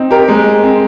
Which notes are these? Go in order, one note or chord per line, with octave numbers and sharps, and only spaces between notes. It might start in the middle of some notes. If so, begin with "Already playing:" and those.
Already playing: C4 D#4
G4 A#4
G#3
C4